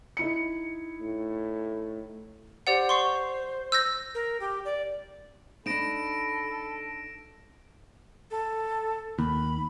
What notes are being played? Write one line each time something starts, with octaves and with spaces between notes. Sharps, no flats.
D#4 E4 C#7
A2
G4 C5 D5 F#5
C6 C#6 C7
E6 G6 A#6
A#4
G4
D5
D4 D#4 A4 B5 A#6 D7 E7
A4
D#2 B5